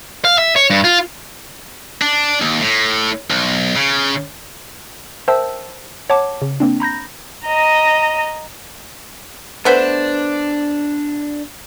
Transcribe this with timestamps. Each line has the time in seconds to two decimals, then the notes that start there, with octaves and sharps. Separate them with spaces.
0.25 F5
0.38 E5
0.56 C#5
0.70 G2
0.84 F4
2.02 D4
2.42 D#2
2.60 A2
3.30 B1
3.76 C#3
5.28 A#4 C5 E5 G5 A5 E6
6.10 C#5 F#5 A5 D6
6.42 C#3
6.60 A#3 C4 D4
6.80 A#5 B5 G6 A#6
7.45 D#5 A#5
9.65 A3 B3 D4 B4 C5